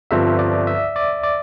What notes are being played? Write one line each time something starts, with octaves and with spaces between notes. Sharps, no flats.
G1 G2 F3 C4 E5
D5
E5
D5
D5